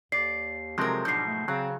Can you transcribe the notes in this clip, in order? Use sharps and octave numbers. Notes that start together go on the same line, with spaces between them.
D#2 D5 C7
C3 F3 F#3 G#3 C4 A#4
G#2 B2 D4 G6 C7
A3
C#3 F#3 C4